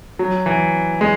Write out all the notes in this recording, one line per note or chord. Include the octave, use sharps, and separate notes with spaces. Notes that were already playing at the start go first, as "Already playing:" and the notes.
F#3
E3
G#3